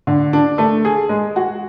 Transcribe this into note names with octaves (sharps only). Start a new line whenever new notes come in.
D3
D4
A3
G#4
G#3
F#4